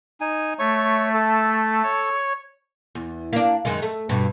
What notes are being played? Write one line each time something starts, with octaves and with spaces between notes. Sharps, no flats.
D#4 G#5
A3 C#5 C#6
A4 A5
C#5
E2
A#3 D4
F#2 D#3 G#3
A3
G2 B2